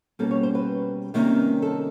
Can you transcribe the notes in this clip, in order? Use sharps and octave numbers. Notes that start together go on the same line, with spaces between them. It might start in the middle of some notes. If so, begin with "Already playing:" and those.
B2 G3 A#3 C#4 A4
C#5
C5
B4
C3 D#3 G3 A#3 C#4
A4